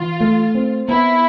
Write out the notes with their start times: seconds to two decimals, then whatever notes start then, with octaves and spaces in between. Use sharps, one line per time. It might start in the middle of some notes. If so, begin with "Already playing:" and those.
Already playing: E3 F4
0.20 A3
0.55 C4
0.88 B3 E4